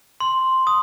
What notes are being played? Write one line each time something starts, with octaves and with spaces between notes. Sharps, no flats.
C6
D#6